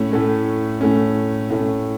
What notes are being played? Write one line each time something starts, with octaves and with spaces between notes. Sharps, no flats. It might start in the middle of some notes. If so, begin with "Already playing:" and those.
Already playing: A2 A3 C#4
A2 A3 C#4
A2 A3 C#4
A2 A3 C#4